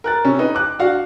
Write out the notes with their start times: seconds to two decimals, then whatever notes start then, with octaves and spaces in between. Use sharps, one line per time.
0.04 A#4 F#6 A6
0.25 C3 C#4
0.39 D#4 B4
0.55 D6 F#6
0.79 D4 F#4 F5